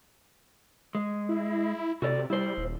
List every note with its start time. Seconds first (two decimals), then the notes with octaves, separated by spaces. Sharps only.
0.95 G#3
1.29 E4
2.02 C3 F#4 A4 D5
2.30 G3 E4 C5
2.57 D#1